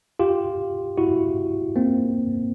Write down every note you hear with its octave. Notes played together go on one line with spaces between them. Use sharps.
F4 G4
E4 F#4
A#3 C4